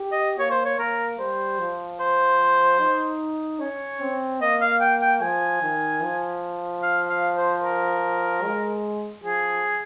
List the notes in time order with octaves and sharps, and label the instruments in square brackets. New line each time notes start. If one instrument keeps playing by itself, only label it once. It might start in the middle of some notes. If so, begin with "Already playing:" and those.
Already playing: [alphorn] G4
[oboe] D#5
[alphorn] A#3 [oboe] C#5
[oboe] C5
C#5
[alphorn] A#3 [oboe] A#4
[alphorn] G3 [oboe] C5
[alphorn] F3
[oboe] C5
[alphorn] D#4
[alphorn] C#4 [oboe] C#5
[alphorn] C4
[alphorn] A#3 [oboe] D#5
[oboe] F5
G5
G5
[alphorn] F3 [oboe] G#5
[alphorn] D#3
F3
[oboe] F5
F5
C5
A#4
[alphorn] G#3
[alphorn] F3 [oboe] G#4